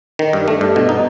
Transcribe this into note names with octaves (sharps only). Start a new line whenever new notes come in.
D#3
G2
A3
G2
B2
D#4